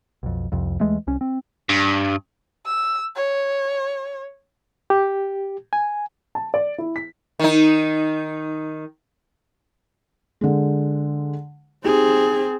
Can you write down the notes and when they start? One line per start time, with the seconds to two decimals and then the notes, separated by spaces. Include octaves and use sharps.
0.23 B1 F2
0.52 C2 F2
0.80 D#2 E3 G#3 A3
1.07 C2 C#4
1.21 C4
1.69 G2
2.66 E6
3.16 C#5
4.90 G4
5.73 G#5
6.35 A5
6.54 D5
6.78 E4
6.96 B6
7.40 D#3 D#4
10.41 D3 G#3
11.85 C4 D#4 G4 G#4